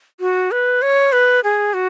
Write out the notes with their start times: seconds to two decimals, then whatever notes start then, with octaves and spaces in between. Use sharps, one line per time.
0.20 F#4
0.51 B4
0.82 C#5
1.12 B4
1.44 G#4
1.74 F#4